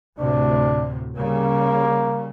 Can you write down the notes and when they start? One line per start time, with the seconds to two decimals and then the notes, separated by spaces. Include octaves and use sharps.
0.19 D2 A2 C3 D4
1.17 C#3 G3 A#3